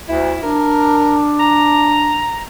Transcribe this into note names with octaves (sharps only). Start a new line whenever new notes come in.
D2 E4
D4 A#4
A#5